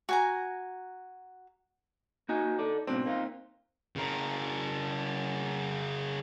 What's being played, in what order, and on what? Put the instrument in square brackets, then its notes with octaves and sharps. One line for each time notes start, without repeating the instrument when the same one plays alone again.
[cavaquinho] F#4 G#5 A#5
[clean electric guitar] A#3 F#4 G#5 [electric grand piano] D#4
[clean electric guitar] A4 D5
[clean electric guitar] G#2 B2 D4 [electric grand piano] C4
[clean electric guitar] A#3 D#4 F4
[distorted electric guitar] C#3 A#4